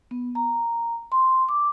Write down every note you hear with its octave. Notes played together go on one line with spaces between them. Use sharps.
B3
A#5
C6
D6